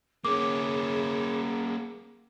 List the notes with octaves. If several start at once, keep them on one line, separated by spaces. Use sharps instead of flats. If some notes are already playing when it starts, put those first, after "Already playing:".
A#3 C#4 G#4 D6